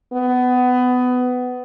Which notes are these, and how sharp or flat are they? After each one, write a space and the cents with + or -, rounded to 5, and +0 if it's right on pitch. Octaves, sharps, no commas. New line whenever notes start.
B3 +20